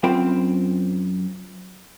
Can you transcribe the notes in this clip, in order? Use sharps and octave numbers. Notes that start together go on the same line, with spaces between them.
F#2 C4 F4 C5 G5 B5